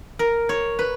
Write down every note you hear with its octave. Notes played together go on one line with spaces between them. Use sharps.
A#4
C#5
B4